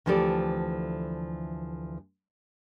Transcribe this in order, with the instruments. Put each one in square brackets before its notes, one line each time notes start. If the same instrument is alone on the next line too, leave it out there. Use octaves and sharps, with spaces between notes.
[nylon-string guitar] D2 E3 F3 G4 A4 D5